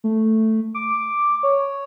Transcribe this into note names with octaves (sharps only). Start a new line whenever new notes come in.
A3
D6
C#5